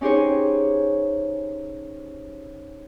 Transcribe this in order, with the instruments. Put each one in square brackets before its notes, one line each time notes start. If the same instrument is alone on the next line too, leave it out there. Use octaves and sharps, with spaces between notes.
[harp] C#4 D#4 G4 G#4 C5 C#5